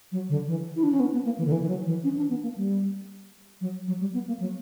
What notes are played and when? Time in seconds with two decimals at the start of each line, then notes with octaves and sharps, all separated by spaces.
0.12 F#3
0.29 D3
0.47 E3
0.76 E4
0.83 D4
0.92 C#4
1.00 B3
1.13 B3
1.25 A#3
1.38 E3
1.45 D3
1.52 E3
1.62 E3
1.68 F#3
1.86 E3
2.04 C#4
2.17 D4
2.30 B3
2.43 A#3
2.56 G3
3.61 F#3
3.87 F#3
4.00 G3
4.14 B3
4.27 A#3
4.40 F#3